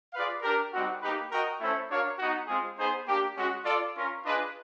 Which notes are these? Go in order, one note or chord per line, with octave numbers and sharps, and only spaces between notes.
F4 G#4 B4 D5 F5
D4 G4 A#4
G3 C4 D#4 F#4
A#3 D#4 G4 B4
F#4 A#4 D#5 G5
A3 C#4 E4 A4 C5
D4 F#4 A#4 C#5 F5
B3 D#4 F#4
G#3 C4 F4 G#4
B3 D#4 G#4 C5
A#3 D4 G4
G#3 C#4 F#4
F4 A4 D5
C#4 F4 A#4
D4 F4 G#4 B4 D#5